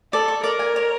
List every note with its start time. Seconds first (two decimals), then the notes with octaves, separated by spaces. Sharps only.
0.12 A4 D5
0.28 C#6
0.44 A#4 D5
0.59 G#5
0.76 C#5